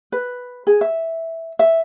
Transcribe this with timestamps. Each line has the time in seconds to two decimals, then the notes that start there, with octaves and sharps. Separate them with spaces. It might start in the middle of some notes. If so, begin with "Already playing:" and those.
0.12 B4
0.67 G#4
0.81 E5
1.59 E5